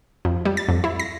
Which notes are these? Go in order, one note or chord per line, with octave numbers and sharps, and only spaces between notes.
F2
G3
A6
F2
E4
A#6